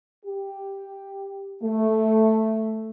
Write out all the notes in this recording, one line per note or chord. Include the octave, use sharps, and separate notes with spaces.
G4
A3